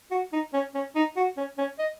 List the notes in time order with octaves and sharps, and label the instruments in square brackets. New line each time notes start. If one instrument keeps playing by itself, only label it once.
[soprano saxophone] F#4
D#4
C#4
C#4
D#4
F#4
C#4
C#4
D#5